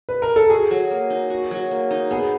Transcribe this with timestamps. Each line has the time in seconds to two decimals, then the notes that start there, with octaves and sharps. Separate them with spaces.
0.09 B4
0.22 A#4
0.36 A4
0.50 F#4 G#4
0.71 F#3
0.91 A#3
1.10 D#4
1.30 F#4
1.51 F#3
1.71 A#3
1.91 D#4
2.11 B3 G#4